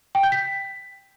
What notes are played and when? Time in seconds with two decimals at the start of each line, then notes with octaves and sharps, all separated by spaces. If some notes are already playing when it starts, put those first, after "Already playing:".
0.15 G5
0.23 G6
0.32 B6